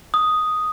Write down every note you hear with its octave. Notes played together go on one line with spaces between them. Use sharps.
D#6